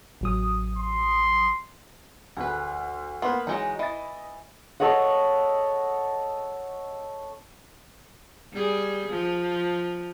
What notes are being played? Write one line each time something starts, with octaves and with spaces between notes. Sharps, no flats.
A1 F#3 D#6
C6
D2 G#4 B4
A#3 B3 B4 C6
E3 F#3 G#3 D#4
E3 D#5 A6
A4 C#5 D#5 F#5
G3 G#4
F3